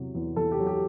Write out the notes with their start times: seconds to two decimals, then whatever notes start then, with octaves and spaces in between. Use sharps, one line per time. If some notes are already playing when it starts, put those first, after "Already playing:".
Already playing: E2 C3 F#3
0.15 E2
0.36 E2 A4
0.52 G4
0.59 F#3
0.67 G4